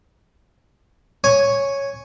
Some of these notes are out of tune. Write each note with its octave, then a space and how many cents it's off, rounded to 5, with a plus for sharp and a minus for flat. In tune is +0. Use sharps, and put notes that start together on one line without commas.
C#5 +0 G#5 +0